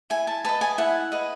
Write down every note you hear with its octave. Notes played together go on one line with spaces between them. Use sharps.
E4 G#5
A5
B4 D#5 A5
G#5
E4 F#5
B4 D#5